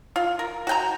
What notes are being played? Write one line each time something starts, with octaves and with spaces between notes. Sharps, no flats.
F4
A#4
F#4 G5 A#5